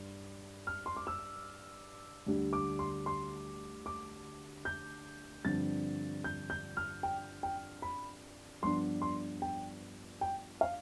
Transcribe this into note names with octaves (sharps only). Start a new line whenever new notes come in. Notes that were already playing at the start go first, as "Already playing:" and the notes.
Already playing: G2
F6
C6
D6
E6
D2 D3 G3 D4
D6
C6
C6
D6
G6
G2 D3 F3 C4 A6
G6
G6
F6
G5
G5
B5
G2 F3 B3 D4 C6
C6
G5
G5
F5